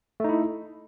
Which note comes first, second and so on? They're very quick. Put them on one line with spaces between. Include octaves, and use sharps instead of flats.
A3 D#4 E4